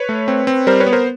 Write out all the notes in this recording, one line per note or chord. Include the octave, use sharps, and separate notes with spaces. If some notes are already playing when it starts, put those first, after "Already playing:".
Already playing: B4 C#5
A3
C4
C4
G3 A#4 C5
B4 C#5
B3
A#4 C5